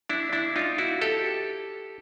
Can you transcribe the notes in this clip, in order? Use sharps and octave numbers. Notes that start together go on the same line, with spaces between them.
D4 E4
D4 E4
D#4 F4
E4 F#4
G4 A4